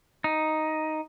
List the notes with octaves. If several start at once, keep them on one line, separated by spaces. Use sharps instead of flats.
D#4